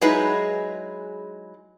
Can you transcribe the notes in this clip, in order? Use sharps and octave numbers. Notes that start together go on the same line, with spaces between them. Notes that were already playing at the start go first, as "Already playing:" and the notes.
F#3 G#3 D#4 E4 G#4 B4